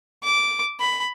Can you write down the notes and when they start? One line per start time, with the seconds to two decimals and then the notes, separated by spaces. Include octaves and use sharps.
0.24 D6
0.80 B5